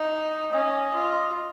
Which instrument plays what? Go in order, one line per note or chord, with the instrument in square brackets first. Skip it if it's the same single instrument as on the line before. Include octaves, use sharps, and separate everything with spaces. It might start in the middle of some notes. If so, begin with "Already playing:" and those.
Already playing: [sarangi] D#4 [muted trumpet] D#5
[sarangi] C#4 [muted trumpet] D#5
[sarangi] F4